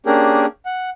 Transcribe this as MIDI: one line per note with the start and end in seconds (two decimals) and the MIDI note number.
0.06 0.46 58
0.06 0.46 61
0.06 0.46 62
0.06 0.46 67
0.06 0.46 68
0.06 0.46 70
0.66 0.90 78